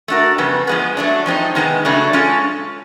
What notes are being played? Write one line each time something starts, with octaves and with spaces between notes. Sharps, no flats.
A3 D4 F#4 A#4
F2 C#3 G3 B3
F3 G#3 B3
F#3 A3 D4
F3 G#3 C4 D#4
C3 D#3 G#3 B3
C#3 F#3 A3 D4
G#3 C#4 F4 A4